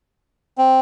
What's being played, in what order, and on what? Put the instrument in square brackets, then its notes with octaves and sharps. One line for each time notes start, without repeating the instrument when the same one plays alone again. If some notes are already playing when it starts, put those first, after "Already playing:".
[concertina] C4